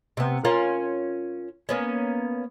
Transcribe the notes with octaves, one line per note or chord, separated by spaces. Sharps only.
C3 B3
C#4 F4 A#4
A#3 B3 C#4